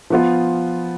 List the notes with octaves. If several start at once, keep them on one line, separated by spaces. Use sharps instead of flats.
F3 B3 F4